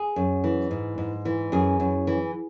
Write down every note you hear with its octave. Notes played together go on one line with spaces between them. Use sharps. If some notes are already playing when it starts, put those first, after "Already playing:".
Already playing: G#4
F#2
E3
G#2
G#2
E3
F#2 G#4
F#2
E3